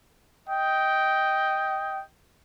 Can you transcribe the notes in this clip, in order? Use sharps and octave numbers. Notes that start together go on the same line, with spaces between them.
D#5 G5